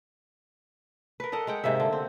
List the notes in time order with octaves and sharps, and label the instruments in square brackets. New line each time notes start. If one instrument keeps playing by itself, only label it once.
[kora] A#4 B4
A4 A#4 D#5 F#5
G#3 F#5 G5
G#2 C3 A#3 E5
D3
C4